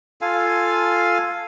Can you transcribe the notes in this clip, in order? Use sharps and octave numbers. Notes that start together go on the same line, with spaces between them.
F4 A4 F5 G#5